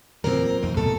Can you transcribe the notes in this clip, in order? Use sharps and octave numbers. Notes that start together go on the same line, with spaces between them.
A#2 E3 F#3 C4 A#4
E2 A#3 D#4
G#2 B2 G3 A4